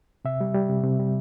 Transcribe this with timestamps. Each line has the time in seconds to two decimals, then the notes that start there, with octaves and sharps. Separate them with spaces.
0.25 C3 E5
0.41 G3
0.54 G3
0.69 C3
0.84 C3
0.99 G3